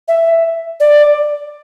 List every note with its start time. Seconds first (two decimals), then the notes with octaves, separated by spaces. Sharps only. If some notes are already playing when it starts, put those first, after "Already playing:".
0.08 E5
0.80 D5